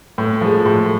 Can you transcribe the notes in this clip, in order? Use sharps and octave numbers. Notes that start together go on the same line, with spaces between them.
A2
F3 G#3
A2